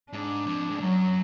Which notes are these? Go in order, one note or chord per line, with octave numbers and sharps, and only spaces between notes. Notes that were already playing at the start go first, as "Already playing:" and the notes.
G#2 D4
F2
G#2
F#2 F#3